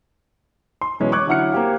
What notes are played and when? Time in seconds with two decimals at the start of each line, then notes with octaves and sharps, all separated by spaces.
0.81 C6
1.00 B2 E3 F#3 G#3 C#4
1.12 C#6 D6 F#6 G#6
1.27 D3 F#3 E4 F#5 F6 C#7
1.52 A#3 C4 G4 F5